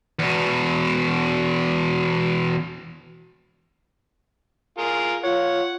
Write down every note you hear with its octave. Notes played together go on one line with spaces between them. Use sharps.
E2 B2
F4 G#4 A#4
F4 C#5 F#5